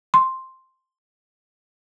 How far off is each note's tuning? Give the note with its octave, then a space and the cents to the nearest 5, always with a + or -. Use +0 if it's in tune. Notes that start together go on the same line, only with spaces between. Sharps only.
C6 +5